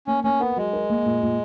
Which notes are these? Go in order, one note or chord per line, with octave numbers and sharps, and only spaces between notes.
A#3 C#4
A#3 C#4
B3 A#4
F#3 G#3
A#4
A#3
A#2
A#2